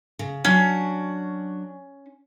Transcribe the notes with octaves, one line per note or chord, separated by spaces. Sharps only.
C#3
F#3 C#4 D4 F#4